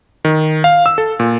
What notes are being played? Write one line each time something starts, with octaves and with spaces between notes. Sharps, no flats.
D#3
F5
E6
A4
A#2